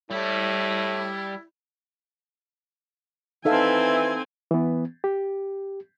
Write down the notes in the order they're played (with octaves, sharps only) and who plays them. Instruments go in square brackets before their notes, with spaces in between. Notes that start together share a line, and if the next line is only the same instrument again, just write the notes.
[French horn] A2 [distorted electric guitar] G3 [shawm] E4
[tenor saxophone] E3 [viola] C4 G#5 [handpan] D#4 A4 F5 [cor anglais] E5
[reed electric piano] E3 B3
G4